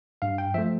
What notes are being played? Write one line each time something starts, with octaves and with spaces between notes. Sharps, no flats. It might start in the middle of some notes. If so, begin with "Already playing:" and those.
G2 F5
G5
F3 A3 E5